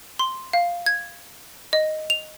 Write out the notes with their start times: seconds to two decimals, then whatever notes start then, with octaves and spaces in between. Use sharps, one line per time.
0.19 C6
0.53 F5
0.86 G#6
1.73 D#5
2.10 F7